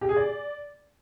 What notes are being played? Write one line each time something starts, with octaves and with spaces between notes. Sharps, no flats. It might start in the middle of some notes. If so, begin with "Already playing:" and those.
G4
G#4
D5